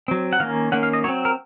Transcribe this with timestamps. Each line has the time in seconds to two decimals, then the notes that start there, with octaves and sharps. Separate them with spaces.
0.08 F#3 C4
0.33 F#5
0.40 D#3 A#3 C#4 F5
0.72 D#3 A#3 C#4 F#5
0.83 F5
0.93 D#5
1.04 F#3 C#5
1.08 C4
1.25 A#4